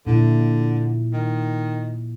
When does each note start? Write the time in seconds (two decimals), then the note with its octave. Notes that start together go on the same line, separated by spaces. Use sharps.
0.07 A#2 D3 E4
1.13 D#3